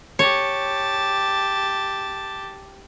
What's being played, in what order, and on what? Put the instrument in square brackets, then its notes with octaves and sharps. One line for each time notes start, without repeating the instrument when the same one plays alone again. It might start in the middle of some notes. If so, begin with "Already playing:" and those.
[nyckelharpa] G4 A5 [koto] C#5